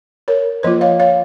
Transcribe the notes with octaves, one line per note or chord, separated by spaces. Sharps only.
A#4 C#5
F3 A#3 F4 C5 D#5
C#5 F5
C#5 F5